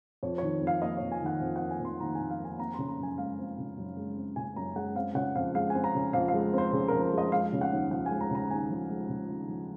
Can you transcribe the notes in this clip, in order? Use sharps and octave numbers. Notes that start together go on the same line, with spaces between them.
F2 C#5
D#3 C#5
F2
F5
A#3 D#5
F2 C#5
G#5
D#3 F#5
F2
A#3 F#5
G#5
F2 C6
D#3 A#5
F2 G#5
F5
A#3
G#5
C4 A#5
C#3 C6
A#5
F#2 G#5
G#3 F5
C4
C#3
F#2
G#3
C4
C#3 G#5
F#2 A#5
G#3 F#5
C4 F5
C#3 F#5
F2 F5
G#3 F5
C4 G#5
A#5
C#3
F2 F5
F5
G#3
C4 C5
C#3 G#4
F2 A#4
A#4
G#3
D#5
G#3 F5
C#3
F#5
D#2
F3 F#5
G#5
G#3
A#5
C#3 A#5
D#2 G#5
F3
G#3
C#3
D#2
F3